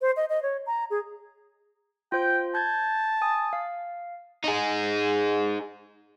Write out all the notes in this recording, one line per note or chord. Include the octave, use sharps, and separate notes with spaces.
C5
D#5
D#5
C#5
A#5
G#4
F4 C5 G5 G6
A5 G6 G#6
G#5 D#6
F5
D#4 G#4